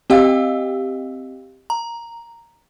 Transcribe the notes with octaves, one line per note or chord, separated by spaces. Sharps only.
C4 G4 D#5 F5 G5 E6
A#5